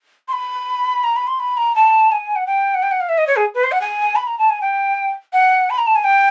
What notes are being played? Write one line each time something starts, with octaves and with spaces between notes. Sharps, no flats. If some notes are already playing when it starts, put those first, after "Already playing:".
C6
B5
A#5
B5
C6
B5
A#5
A5
G#5
F#5
G5
F#5
G5
F#5
F5
E5
D#5
C#5
G#4
B4
C5
F#5
G#5
B5
A#5
A5
G#5
G5
F#5
B5
A#5
A5
G#5
G5